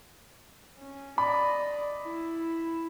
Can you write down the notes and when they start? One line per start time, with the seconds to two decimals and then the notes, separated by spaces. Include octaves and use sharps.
0.78 C#4
1.18 D5 D#5 B5
2.03 E4